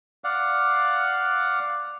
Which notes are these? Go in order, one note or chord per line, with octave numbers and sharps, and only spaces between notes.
D5 F5 F#5